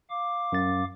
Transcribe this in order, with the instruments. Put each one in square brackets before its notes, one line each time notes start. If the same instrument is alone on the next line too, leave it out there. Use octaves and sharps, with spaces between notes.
[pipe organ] F5 D6
[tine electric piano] F#2 A6